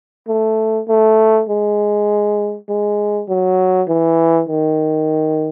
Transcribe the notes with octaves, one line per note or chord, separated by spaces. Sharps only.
A3
A3
G#3
G#3
F#3
E3
D#3